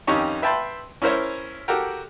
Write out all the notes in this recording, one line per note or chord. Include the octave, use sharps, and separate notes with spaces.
F2 D#3 C#4 G4 D#5 C#6
B4 E5 G5 A5 B5 C6
C#4 E4 A#4 C5 C#5
F#4 G4 A4 A#4 G5